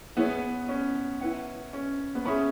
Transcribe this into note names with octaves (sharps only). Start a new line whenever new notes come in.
B3 E4 G#4 C#5
C#4
E4 B4 F#5
C#4
B3
C#4 G#4 E5 B5